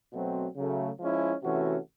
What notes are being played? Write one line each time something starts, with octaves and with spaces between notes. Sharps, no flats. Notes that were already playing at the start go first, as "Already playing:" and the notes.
B2 F#3 A3 C4
C#3 F#3 A3
F3 G#3 C#4 E4
C3 E3 A3 C#4 F#4